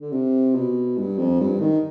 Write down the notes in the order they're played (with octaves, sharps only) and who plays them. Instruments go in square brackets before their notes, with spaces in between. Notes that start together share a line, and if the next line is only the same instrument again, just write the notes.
[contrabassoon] D3
C3
B2
G2
F2
G2
D#3